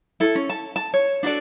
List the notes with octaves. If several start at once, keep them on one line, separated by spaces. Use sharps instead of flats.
E4 A4
C#4
A5
A5
C#5
D4 F#4 A4 D5